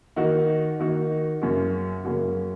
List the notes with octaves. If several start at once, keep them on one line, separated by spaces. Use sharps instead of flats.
D#3 A#3 D#4 F#4
D#3 A#3 D#4 F#4
F#2 C#3 A#3 C#4 F#4
F#2 C#3 A#3 C#4 F#4